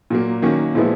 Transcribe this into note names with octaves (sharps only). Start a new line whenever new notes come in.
A#2 F#3 A#3
D#3 F#3 A#3 C#4
A#2 F3 G#3 B3 E4